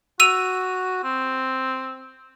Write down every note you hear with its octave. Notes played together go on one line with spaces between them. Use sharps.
F#4 E6 D#7 F7
C4